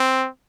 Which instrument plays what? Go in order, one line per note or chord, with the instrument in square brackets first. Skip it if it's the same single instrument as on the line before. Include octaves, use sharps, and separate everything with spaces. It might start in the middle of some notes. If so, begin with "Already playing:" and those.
Already playing: [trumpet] C4